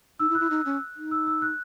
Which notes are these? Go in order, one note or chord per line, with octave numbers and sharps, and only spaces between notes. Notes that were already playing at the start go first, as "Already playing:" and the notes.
D#4 E6
E4
F#6
E4
D#4
C#4
D#4
E6
E6
F#6